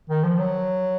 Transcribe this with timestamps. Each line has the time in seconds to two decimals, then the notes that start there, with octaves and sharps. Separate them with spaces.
0.10 D#3
0.24 F3
0.39 F#3